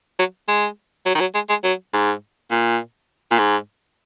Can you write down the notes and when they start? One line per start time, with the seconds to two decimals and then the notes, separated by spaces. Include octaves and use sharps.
0.19 F#3
0.48 G#3
1.06 F#3
1.15 D#3
1.20 F#3
1.34 G#3
1.49 G#3
1.64 F#3
1.94 G#2
2.51 A#2
3.31 A#2
3.39 G#2